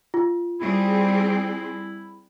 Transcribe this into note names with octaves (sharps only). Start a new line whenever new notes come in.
F4
G3 C4 E4 G#4